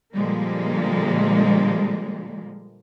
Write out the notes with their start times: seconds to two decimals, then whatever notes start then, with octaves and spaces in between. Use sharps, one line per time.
0.13 A#2 D3 F3 G3 G#3 A#3